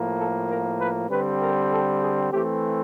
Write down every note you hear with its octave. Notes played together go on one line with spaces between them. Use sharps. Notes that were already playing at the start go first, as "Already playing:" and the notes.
Already playing: A2 F3 A#3
A4
A#4
B4
D3 G3 C4 B4
A#4
A4
G#4
E3 A3 C4 G4